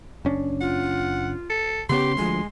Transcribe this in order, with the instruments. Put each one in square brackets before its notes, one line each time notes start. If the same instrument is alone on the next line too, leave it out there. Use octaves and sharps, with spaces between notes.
[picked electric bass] F#1 C#4 D4
[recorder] F4 [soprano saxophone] F#5
[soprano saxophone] A4
[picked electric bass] C#3 B3 C#4 [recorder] G4 [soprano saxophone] C6
[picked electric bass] D2 F3 [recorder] G#3